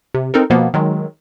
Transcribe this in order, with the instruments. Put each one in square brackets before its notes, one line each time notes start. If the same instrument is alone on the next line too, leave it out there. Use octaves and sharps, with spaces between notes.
[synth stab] C3
C4 D#4 A4 A#4
B2 F3 A#3 B3
D#3 F#3 G#3